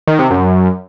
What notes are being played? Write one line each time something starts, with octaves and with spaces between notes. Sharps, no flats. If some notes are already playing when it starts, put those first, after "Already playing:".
D#3
C3
F#2